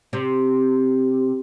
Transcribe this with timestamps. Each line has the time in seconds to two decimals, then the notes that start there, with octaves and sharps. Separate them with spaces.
0.13 C3